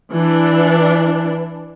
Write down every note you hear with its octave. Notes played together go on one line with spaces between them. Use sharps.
E3 D4